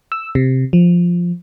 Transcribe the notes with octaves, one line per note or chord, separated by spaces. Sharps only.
E6
C3
F3